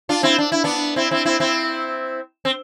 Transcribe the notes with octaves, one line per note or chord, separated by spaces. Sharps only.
D4 F4
C4 E4
D4
E4
B3 D4
C4 E4
C4 E4
C4 E4
C4 E4
C4